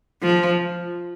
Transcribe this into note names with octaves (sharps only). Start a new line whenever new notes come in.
F3